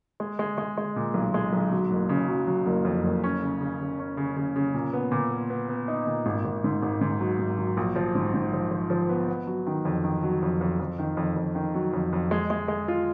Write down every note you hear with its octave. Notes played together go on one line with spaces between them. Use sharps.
G#3
G#3
G#3
G#3
A#2
B1
G#3
B1
F#3
F#1
C#3
F#3
F#3
F#1
F2
F#1
C#4
C#3
C#3
C#3
C#4
C#3
C#3
C#3
A#2
B3
A#2
B3
B3
B3
D#4
A#2
G#1
G#1
G#2
G#1
G#2
F#3
G#1
F#3
A#1
F3
G#2
G#2
F3
F3
F3
B3
B3
F#3
D#3
F2
D#3
F#3
F2
F2
F2
D#3
F2
F2
D#3
F#3
F2
F2
G#3
G#3
G#3
F4